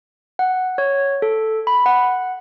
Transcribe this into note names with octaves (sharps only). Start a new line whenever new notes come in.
F#5
C#5
A4
B5
F#5